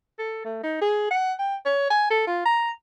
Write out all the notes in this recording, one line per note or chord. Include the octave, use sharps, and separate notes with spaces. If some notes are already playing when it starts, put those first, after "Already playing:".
A4
A3
D#4
G#4
F#5
G5
C#5
G#5
A4
F4
A#5